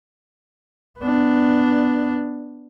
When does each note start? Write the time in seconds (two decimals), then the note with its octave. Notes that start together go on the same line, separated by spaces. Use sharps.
0.99 B3 D4